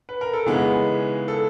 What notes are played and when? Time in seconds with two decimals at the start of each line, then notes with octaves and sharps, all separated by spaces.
0.09 B4
0.21 A#4
0.33 A4
0.46 C#3 E3 G#3 B3 D#4 G#4
1.28 A4